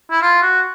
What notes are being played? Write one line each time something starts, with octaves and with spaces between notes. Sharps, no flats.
E4
F4
F#4